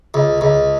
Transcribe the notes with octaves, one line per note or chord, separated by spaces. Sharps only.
C#2
C#2